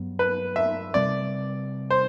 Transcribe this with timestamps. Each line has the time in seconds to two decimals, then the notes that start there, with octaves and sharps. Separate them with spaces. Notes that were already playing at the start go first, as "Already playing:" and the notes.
Already playing: G2 F#3 B3
0.19 B4
0.56 E5
0.94 C3 G3 C4 D5
1.90 C5